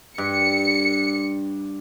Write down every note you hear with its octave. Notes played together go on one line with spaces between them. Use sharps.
G2 C#7